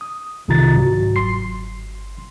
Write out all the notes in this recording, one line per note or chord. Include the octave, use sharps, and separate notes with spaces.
D#6
C2 C3 D#3 F4 A#5 A6
G#2 F#3 F#4
G1 C6 C7